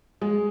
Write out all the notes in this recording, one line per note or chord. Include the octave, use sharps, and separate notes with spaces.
G#3